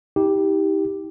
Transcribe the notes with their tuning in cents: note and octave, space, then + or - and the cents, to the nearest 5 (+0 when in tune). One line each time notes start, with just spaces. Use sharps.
D#4 +45 G4 +0